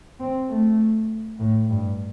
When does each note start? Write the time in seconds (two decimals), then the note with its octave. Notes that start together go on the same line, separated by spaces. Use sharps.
0.20 C4
0.49 A3
1.39 A2
1.70 G2